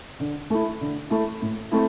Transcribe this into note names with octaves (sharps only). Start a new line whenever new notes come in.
D3
A3 E4
D3
A3 E4
A2
A3 C4 E4